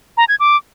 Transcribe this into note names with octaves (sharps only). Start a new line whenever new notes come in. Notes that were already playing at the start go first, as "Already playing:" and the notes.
A#5
G#6
D6